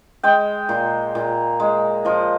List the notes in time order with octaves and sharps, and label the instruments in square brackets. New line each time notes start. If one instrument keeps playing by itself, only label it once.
[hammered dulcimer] G#3 G5
A#2
A#2
G#3
F3 D#5